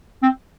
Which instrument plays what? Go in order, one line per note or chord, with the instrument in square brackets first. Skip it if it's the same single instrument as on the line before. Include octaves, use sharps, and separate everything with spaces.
[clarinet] C4